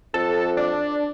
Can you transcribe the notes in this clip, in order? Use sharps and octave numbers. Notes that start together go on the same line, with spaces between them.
F2 A4
D4